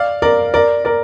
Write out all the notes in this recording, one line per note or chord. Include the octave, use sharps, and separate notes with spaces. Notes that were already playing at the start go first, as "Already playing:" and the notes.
Already playing: D5 F5
A#4 D5
A#4 D5
A#4 D5